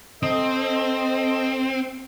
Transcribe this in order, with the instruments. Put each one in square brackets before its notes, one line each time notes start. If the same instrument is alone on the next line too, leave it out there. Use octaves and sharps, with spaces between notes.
[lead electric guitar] C4 [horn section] A4 D#5